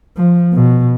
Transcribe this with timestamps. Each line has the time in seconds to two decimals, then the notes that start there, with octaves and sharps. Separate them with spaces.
0.17 F3
0.53 B2